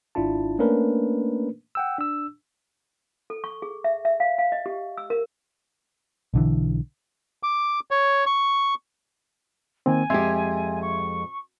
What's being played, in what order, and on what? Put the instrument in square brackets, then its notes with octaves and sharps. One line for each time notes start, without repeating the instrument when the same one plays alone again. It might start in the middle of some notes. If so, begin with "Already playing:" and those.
[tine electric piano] G#1 D4 E4 F4 A5
A3 A#3 C#4 D4 A#4 B4
F#5 G5 E6
D4 E6
[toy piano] A4
C#6
G#4
E5
E5
F5
F5
D#5
G4
E6
A#4
[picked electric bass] B1 D3 E3
[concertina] D6
C#5
C#6
[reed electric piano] D#3 A#3 C4 [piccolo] G#5
[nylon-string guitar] F2 G#3 G4 [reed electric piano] E5 C6 G#6
[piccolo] C#6